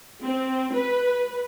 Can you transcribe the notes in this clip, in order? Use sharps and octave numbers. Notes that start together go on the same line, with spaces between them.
C4
B4